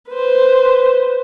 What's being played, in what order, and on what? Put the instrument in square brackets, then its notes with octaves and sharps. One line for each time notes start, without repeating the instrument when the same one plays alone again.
[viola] B4 C5